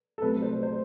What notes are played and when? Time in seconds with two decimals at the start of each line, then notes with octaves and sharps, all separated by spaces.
0.18 A4
0.22 C2 C3 F#3 A3 B4
0.42 C5
0.63 C5